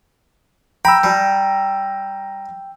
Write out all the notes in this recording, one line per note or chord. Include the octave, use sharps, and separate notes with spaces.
G5 A#5 B5 E6
G3 G4 A5